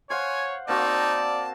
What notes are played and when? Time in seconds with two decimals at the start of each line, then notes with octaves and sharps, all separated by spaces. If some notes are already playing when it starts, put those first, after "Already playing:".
0.10 C5 C#5 F5 F#5 G#5
0.68 A#3 C4 D#4 F#4 D5 A5